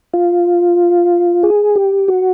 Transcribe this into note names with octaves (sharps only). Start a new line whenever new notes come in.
F4
G#4
G4
F#4